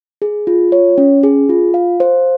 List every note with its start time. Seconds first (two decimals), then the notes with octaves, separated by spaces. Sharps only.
0.22 G#4
0.47 F4
0.72 C#5
0.98 C#4
1.23 G#4
1.49 F4
1.74 F5
2.00 C5